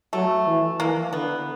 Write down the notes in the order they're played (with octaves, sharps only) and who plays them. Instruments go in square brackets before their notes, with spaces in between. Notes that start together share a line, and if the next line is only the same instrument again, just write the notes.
[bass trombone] F#3 [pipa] A3
[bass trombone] E3
[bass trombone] E3 [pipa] A#3
[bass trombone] D3 [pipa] B3